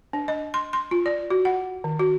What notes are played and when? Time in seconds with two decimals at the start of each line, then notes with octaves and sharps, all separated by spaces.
0.13 D4
0.28 D#5
0.54 C6
0.73 C6
0.91 F4
1.06 D5
1.30 F#4
1.45 F#5
1.84 D#3
1.99 F#4